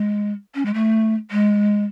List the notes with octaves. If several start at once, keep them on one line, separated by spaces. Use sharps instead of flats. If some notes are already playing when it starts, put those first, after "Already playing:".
Already playing: G#3
C#4
G#3
A3
G#3